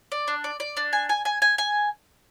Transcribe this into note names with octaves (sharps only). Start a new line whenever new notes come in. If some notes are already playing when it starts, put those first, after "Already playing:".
D5
D4
D5
D5
D4
G#5
G#5
G#5
G#5
G#5